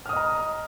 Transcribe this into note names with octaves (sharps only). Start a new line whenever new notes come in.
D#5 A#5 D#6 F6